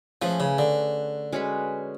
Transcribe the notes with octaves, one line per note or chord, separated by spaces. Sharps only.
F3 A3 C#4 G#4 B4
C#3
D3
G#3 C#4 F#4 B4